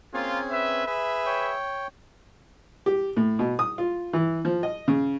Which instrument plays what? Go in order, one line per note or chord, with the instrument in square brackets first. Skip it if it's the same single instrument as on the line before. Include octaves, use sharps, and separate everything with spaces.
[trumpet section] A#3 F4 [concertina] C4 C#4 G#4
[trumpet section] B4 E5
G#4 B4 E5
[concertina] C#5 G5
[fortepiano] G4
A2
B2
D#6
F4
E3
F3
D#5
C#3